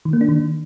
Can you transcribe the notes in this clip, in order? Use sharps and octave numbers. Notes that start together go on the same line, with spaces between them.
D#3
A#3
D4
D#3